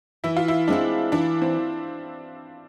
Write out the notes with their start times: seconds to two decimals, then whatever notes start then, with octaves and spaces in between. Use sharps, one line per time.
0.24 E3 E4
0.37 F4
0.48 E4
0.68 G#3 C4 D4 E4
1.12 E3 D4
1.42 C4